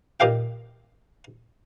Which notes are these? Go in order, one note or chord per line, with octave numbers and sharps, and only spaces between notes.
A#2 D#3 G4 F5 G5